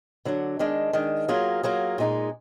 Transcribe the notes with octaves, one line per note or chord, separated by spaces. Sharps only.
D3 F#3 D4
D#3 G#3 D4
D#3 G#3 D4
F#3 A#3 F4 G#4
F#3 A#3 F4 G#4
A#2 G#3 D#4 G#4